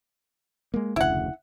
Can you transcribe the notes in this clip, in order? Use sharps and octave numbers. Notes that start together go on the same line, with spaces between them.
G#3 A#3
F1 D2 C#3 E4 F#5